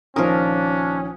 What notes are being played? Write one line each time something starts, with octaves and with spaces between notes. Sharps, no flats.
A#1 D#3 F3 C#4 D4 A#4 D#6